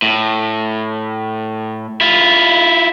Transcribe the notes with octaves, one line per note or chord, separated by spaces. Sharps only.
A2
E4 F4